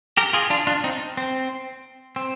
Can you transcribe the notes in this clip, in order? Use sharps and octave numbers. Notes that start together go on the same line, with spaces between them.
G4 A#4
F4 G#4
D4 F4
D4 F4
C4 D#4
C4
C4